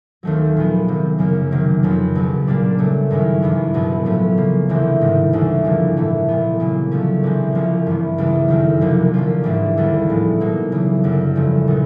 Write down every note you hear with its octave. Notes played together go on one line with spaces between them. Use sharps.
D#2 D#3 F#3 A3 C4
A#2 F3 G#3 B3
C3 D#3 F#3
F#2 C#3 F#3 A#3
C3 D#3 F#3 A#3
F2 C#3 F#3 B3
C#2 B2 F#3
A#2 G3 A#3 D4
C#3 F#3 A3
G2 D#3 G#3 C#4 E4
G2 E3 G#3 B3 E4
C2 B2 F#3 B3
A2 F3 A3 C#4
C#3 F3 A#3
D2 C3 E3 G#3 C4
G#2 D#3 G3
D2 C#3 E3 G#3
G2 D3 F3 A#3
A2 E3 A3
A#2 G3 B3
C#3 F#3 A#3
D3 F3 A3 C#4
C3 E3 G#3 C4
C2 C3 F3 A#3 C#4
G2 E3 G3 B3
C#2 C#3 E3 G3
F#2 D#3 F#3 A3
C2 C3 F3 A#3
D3 F3 A#3 C#4 F4
G#2 E3 G3 A#3 D4
D#2 D3 G3 B3
A2 F3 G#3
B2 F#3 A#3 D#4
C#3 E3 A3
F#2 D3 G3
E2 C#3 F3 A3
A#2 F#3 B3 D#4